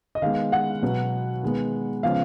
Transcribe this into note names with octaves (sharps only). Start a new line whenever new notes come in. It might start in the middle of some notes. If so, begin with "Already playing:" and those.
D#5
D#3 G#3 B3 F5
F#5
B2 F#3 B3
D#3 G#3 B3
C#3 F3 G#3 B3 F5